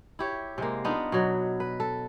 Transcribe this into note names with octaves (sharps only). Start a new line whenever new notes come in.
E4 G4 C#5
C3 G#3 A#3
B3 D4 D#4 F4
B2 F#3
B4
A4